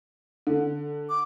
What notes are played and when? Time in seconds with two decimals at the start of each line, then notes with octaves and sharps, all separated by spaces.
0.47 D3
1.09 D6